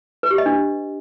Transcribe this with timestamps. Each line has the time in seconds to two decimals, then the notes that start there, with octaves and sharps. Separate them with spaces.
0.23 B4
0.31 G4
0.38 D#5
0.46 D4